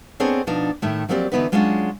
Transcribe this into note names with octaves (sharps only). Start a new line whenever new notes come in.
B3 C4 D4 G#4 A4 C#5
B2 F3 D4 D#4
A2 D#3 A3
F3 F#3 A#3 C4 G4 D5
D3 E3 B3 D#4 F#4 B4
F#3 G#3 C#4 D4 F4 F#4